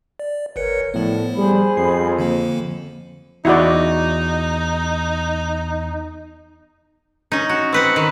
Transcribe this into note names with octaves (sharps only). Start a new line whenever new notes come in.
D5
G1 A#4 B4 C#5 C#7
A2 F3 B3 A4 D5
G3 G#4 C5 B5
F2 C7
D3 F3 A#3
E2 D#4 E4 F#4 D5
C#4 D#4
F#4
C4 B4 F#5
D#3